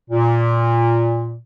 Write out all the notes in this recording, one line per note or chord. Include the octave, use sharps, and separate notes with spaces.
A#2